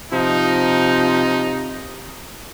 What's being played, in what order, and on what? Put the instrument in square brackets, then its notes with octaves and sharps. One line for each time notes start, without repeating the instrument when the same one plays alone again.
[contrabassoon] C3 [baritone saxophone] F3 [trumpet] D#4